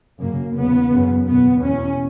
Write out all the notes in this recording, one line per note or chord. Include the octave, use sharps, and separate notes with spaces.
F#2 C#3 A#3
E2 C#3 B3
F#2 C#3
E2 B2 B3
E2 B2 C#4